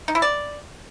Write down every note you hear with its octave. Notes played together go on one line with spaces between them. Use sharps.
D#4
E4
D5